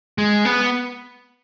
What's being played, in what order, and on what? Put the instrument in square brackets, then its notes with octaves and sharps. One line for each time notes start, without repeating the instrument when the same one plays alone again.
[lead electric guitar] G#3
B3